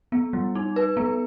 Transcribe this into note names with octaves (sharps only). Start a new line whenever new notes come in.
B3
G3
D#4
B4
B3